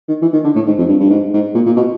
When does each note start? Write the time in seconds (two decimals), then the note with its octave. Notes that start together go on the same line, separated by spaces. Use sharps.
0.08 D#3
0.22 E3
0.33 D#3
0.44 D3
0.55 A2
0.67 G#2
0.78 F2
0.89 G2
1.00 G2
1.10 G#2
1.33 G#2
1.55 A#2
1.66 A#2
1.76 B2